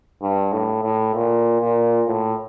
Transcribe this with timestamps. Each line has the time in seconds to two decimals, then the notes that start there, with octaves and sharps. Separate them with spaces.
0.22 G2
0.53 A2
0.84 A2
1.15 A#2
1.60 A#2
2.07 A2